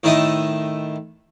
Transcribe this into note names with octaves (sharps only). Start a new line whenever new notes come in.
A2 D#3 A4 D#5 E5 D#6